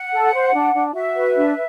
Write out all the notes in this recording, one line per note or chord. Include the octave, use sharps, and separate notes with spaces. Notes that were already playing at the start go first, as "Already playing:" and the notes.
Already playing: F#5
A4
C5
D4
D4
F#4 E5
B4
D4